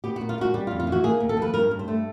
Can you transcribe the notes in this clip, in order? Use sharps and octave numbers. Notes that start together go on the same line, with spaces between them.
B3 G4
F#4
A#2
F4
G#3 F#4
G3 G4
F4
F2
F4
E3
F#4
A#3 G#4
D#2
A4
F3 B4
G2 A#4
G2
C5
A3